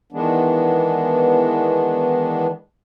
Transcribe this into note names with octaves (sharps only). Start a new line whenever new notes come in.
D#3 E3 G#3 B3 D4